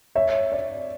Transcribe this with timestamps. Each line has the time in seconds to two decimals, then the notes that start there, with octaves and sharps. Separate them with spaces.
0.15 C#5 E5
0.52 D5